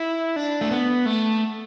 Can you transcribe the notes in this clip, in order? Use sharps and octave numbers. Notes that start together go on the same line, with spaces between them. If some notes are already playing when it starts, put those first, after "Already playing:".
Already playing: E4
D4
A3
B3
A3